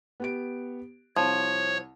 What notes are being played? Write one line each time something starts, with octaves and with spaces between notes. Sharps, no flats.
B3 G4 D7
C2 F3 C#5